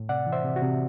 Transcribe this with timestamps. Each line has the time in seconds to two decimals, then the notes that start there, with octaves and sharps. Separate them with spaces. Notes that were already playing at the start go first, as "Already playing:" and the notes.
Already playing: A2
0.09 C3 D5 F#5
0.26 E3
0.32 C5 E5
0.44 C3
0.56 F#4
0.62 C3